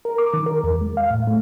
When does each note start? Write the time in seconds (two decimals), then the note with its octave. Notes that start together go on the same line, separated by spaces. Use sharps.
0.05 A#4
0.18 D6
0.34 D#3
0.46 A#4
0.64 E2
0.81 G#3
0.97 F5
1.11 A2
1.27 A3